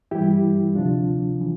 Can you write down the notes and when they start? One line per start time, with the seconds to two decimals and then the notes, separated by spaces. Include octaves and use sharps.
0.11 G2 E3 G3 E4 G4
0.75 D2 C3 F3 D4 F4
1.41 E3